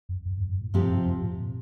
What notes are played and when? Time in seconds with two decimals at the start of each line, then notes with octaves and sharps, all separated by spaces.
0.09 F2
0.26 F2
0.37 G2
0.49 G2
0.61 A2
0.73 G2 C3 F3 C4 G4
0.90 F2
1.06 F2
1.22 A2
1.39 A#2